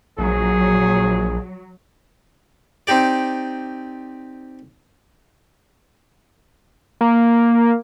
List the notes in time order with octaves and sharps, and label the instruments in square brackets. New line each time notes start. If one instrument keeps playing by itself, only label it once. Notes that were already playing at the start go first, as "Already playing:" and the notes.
[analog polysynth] A#1 [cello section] F#3 [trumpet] G#4
[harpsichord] C4 D#4 G4 D5
[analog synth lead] A#3